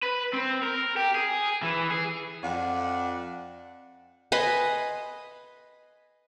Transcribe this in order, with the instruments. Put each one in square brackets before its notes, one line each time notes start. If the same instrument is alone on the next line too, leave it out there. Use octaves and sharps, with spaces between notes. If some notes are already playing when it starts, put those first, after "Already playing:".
[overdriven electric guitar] B4
C4
A#4
G4
G#4
E3
G#4
[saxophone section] F2 D5 F#5
[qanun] B4 D#5 G#5 C6